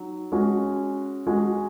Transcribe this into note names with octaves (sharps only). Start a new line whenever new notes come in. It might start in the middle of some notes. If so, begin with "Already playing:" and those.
Already playing: F#3 D#4
G#3 C#4 F#4
G#3 F#4